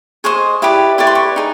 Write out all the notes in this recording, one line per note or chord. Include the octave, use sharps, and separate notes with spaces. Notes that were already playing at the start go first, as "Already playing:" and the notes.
G#4 C5 D#5 C#6
E4 G4 B4 D5
E4 G4 B4 D5 C#6
C6
C#6
D#4 G#4